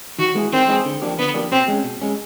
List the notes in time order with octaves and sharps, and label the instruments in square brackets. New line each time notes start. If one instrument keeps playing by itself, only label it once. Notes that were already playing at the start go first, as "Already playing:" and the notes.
[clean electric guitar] D#3 [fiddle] F#4
[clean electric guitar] G#3 B3 E4 G#4
[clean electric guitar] D#3 [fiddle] C4
[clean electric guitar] G#3 B3 E4 G#4
D3
F3 A#3 D4 G4
[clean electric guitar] D3 [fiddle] B3
[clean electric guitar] F3 A#3 D4 G4
[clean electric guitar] B2 [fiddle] C4
[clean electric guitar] G#3 C#4
B2
G#3 C#4